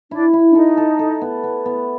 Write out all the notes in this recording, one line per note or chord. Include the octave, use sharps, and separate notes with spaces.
D4 E4
E4
D4
D#4 A4
A4
A4
B3
B3
B3